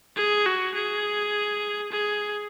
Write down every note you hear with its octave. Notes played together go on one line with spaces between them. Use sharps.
G#4
F#4
G#4
G#4